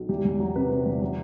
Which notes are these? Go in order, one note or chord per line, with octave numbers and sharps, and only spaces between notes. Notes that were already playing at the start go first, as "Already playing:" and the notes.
Already playing: B1
E2 G4
E2
F#3
C3 B4
C3
E2
F#3